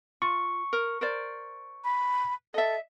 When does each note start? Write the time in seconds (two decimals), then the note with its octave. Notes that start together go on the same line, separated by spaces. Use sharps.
0.22 F4 C#6
0.73 A#4
1.01 A#4 C5 D5
1.84 B5
2.54 A4 D#5 E5